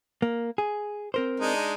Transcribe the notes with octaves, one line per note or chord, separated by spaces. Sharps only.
A#3
G#4
C4 A#4 C5
G#3 D4 D#4